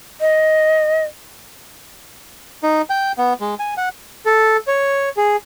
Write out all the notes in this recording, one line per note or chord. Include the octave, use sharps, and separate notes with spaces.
D#5
D#4
G5
B3
G#3
G#5
F#5
A4
C#5
G#4